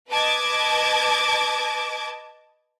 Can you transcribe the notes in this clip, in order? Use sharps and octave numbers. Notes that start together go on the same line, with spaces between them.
B4 D#5 A5 D6 G#6